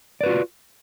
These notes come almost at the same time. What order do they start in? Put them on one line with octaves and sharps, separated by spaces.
D5 B4 F#4 F4